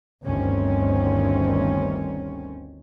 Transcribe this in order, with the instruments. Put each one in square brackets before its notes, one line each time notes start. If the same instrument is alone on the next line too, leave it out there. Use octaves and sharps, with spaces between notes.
[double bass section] G1 D2 G2 D#3 C4 C#4